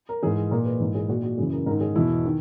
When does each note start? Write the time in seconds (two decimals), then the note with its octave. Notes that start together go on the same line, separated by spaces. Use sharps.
0.09 A#4
0.23 G#2 E3 G#4
0.51 A#2 A#4
0.65 B4
0.80 G#2 E3 A#4
0.95 G#4
1.09 A#2 F#4
1.23 F#4
1.38 F#2 C#3 E3 G#4
1.52 A#4
1.66 G#2 A#4
1.70 D#3
1.81 G#4
1.95 E2 B2 E4
2.25 D#3